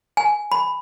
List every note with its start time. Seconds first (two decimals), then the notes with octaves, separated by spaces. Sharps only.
0.17 G#5
0.52 B5